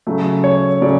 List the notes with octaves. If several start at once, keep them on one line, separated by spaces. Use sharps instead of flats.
C#3 F#3 A3
C#5
C#3 F#3 A3 D5